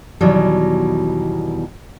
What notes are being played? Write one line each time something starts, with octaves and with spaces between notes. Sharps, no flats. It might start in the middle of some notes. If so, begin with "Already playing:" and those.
E2 B2 D#3 E3 F#3 G3